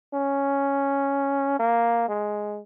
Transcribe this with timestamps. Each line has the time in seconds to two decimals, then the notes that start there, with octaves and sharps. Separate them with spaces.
0.14 C#4
1.59 A#3
2.09 G#3